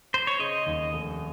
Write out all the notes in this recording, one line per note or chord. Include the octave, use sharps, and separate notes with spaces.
C5
C#5
C#3 D#5
D#2
F1